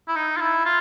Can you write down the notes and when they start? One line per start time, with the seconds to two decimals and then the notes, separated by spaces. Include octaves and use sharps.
0.08 E4
0.16 D#4
0.37 F4
0.41 E4
0.65 F4